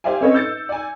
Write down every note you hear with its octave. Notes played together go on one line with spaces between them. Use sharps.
G4 C5 D5 E5 F5 G#5
C4 C#4 A4 B4 C#5 D#5
E6 G6 A6 C#7
D5 G#5